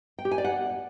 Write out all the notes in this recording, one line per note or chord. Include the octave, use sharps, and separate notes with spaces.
G5
G4
G#5
D5
F#5